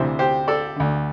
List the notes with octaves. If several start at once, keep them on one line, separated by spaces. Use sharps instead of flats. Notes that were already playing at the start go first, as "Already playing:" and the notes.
Already playing: D2 C3 E3 C5 E5
G4 C5
A4 D5
D2 D3